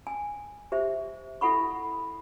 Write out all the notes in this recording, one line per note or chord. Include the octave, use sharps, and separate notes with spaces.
G#5
G4 C5 E5
E4 A4 F#5 B5 C#6